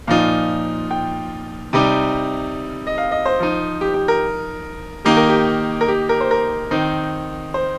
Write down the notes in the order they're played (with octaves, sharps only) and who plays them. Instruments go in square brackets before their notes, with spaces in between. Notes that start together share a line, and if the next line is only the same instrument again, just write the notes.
[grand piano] A#2 F3 D#4 [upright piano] F5
[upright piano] G5
[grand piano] C3 G3 D#4
[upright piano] D#5
F5
D#5
C5
[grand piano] F3 D#4
[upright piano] G4
G4
A#4
[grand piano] D#3 A#3 D#4 [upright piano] G4
[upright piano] A#4
G4
A#4
G4
A#4
C5
A#4
[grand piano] D#3 C4 D#4
[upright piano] C5